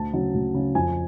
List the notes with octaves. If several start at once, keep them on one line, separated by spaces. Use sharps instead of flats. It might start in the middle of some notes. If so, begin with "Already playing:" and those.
Already playing: D2 A5
C#3 F#3
D2
C#3 F#3
F2 G#5